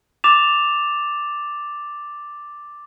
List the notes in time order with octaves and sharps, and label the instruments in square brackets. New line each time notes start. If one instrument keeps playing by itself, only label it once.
[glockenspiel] D6 A6 E7 F7